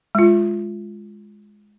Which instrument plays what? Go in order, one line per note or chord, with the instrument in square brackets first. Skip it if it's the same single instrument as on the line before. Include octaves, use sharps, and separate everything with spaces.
[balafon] G#3 F4